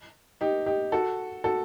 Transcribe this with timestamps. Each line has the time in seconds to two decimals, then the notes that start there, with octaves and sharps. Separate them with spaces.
0.41 D#4 G4
0.66 D#4 G4
0.92 F#4 A4
1.44 F#4 A4